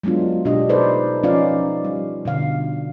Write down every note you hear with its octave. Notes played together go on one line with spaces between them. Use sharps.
F#3 G#3 B3 D4 F4
B2 D4 G4 D#5
D#4 A4 B4 C5 D5
F3 C#4 D#4 F4 D5 F5
G3
B2 D3 F5